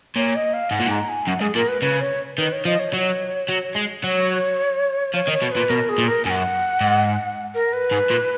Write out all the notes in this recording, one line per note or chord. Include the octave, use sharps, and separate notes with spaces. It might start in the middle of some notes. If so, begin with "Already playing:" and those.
A#2 C#5
D#5
F5
G#2 F#5
A#2
G#2 A#5
G#5
F#2 F#5
G#2 G#4
A#2 A#4
B4
C#3 B4
C#5
D#3 B4
C#5
F3 D#5
C#5
F#3
F#3
G#3
F#3 C#5
F3 C#5
D#3
C#5
B2
A#2 B4
B2 A#4
G#4
A#2
A#4
F#2 F#5 G#5
G#2
A#4
B4
G#2
A#2